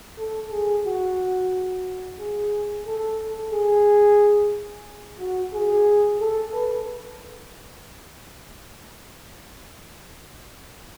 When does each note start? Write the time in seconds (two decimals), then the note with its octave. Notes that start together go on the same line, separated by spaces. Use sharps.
0.18 A4
0.51 G#4
0.86 F#4
2.19 G#4
2.86 A4
3.52 G#4
5.19 F#4
5.53 G#4
6.20 A4
6.53 B4